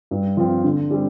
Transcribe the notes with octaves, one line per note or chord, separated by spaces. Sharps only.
G2
F3 C4
D3
G3 C4